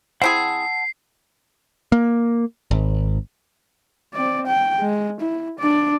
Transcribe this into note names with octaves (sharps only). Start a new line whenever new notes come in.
C4 E4 G#4 F#5 A5 E6 C7
A#3
G#1
C4 D5
G5
G#3
E4
D4 D5